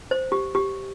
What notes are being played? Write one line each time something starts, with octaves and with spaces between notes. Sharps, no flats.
C5
G4
G4